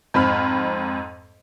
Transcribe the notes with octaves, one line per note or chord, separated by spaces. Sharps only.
F2 G#2 C4 B5 F6